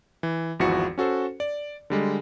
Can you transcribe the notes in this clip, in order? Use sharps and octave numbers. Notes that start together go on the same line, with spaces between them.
E3
G#1 E2 F3 E4 F#4 C#7
C#4 F#4 A4 C5
D5
D3 G3 G#3